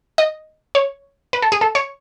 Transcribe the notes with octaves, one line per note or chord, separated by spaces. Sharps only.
D#5
C#5
B4
A4
G#4
A4
C#5